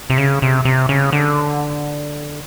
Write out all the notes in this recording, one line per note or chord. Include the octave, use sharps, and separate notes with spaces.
C3
C#3
C3
C3
C#3
D3